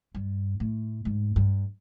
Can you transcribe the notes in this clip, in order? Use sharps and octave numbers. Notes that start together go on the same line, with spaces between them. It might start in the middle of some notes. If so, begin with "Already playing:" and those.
G2
A2
G#2
G2